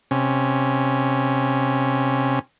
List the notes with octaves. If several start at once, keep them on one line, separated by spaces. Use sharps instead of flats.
C3 C#4